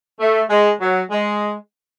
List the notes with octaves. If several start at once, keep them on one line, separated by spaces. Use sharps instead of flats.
A3
G#3
F#3
G#3